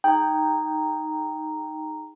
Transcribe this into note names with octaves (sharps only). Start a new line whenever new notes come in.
D#4 G#4 G5 A#5